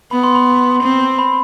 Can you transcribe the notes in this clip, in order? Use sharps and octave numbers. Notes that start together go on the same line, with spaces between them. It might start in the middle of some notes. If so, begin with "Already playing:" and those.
B3 B5
C6
B5
C4
B5